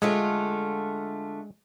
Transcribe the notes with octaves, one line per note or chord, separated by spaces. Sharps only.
D3 G#3 A3 F4